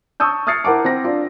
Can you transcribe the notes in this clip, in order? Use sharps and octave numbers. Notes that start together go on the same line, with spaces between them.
A5 C#6 D#6 E6 G6
D#6 F6 G#6 A6 C7 C#7
E4 A#4 F#5 A5 D6
C4 F#5 A#6
D4 F4